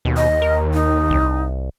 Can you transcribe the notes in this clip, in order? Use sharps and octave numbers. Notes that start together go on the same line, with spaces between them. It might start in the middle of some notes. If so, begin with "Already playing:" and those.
D#2 B2
D#5
A#4
D#4
C2